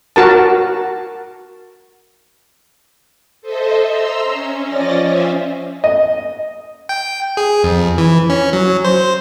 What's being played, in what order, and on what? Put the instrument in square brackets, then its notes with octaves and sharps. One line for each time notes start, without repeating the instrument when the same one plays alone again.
[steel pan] F#4 A#4 A5
[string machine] A4 C5 D#5 E5
A#5 C6 E6
C#4
F3 C#4 D5 D#5 A6 A#6
C#4 C5 E5 F5 G#5
[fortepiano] D#5
[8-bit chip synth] G5
G#4
F2
E3
C#4
F#3
C5